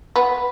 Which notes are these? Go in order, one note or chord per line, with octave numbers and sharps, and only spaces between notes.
B3